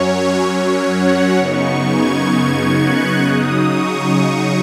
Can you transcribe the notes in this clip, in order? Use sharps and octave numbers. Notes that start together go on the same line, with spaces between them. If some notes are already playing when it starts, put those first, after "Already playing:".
Already playing: F#2 F#3 C#4 C#5
C#5
F#5
F#2 C#3 B3 D#4 C#6
G#6
F#6
C#3 F#3 D#4 D#6
C#6